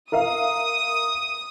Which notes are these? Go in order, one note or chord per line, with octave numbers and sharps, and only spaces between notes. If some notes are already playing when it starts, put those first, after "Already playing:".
A#4 E5 F5 D#6